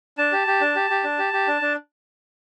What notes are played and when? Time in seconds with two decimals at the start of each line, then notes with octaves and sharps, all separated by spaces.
0.18 D4 A5
0.32 G4
0.47 G4
0.61 D4
0.76 G4
0.90 G4
1.04 D4
1.19 G4
1.33 G4
1.47 D4
1.61 D4